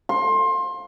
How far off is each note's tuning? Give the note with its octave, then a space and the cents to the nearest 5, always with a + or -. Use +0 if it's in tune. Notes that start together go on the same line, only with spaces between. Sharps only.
C6 +25